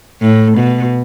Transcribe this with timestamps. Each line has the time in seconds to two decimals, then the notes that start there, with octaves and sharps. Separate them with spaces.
0.22 A2
0.58 B2